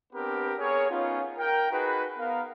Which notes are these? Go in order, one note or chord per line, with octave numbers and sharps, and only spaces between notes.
B3 C4 D4 G4 A#4 B4
B3 G#4 A#4 C#5
B3 C#4 D#4 F4
A#4 G5
D#4 F#4 G#4 B4
B3 A#4 F5